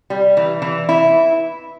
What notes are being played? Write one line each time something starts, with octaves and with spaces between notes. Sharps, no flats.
G3
E3
E3
E4